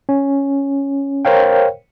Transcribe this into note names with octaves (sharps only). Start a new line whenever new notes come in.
C#4
A#4 C5 C#5 F5 G5